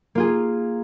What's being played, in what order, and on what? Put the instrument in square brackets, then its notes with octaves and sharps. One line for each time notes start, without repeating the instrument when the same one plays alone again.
[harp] A#3 F4 G#4